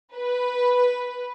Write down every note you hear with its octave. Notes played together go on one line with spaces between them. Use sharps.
B4